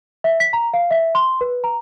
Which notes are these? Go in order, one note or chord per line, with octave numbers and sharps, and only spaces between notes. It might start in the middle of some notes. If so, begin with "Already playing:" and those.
E5
B6
A#5
F5
E5
C6
B4
A#5